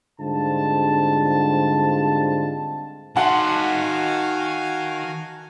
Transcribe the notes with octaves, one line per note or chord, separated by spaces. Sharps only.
G#2 D3 G3 C4 F4 A5
D#3 F#4 F5 F#5 G#5 A5 C6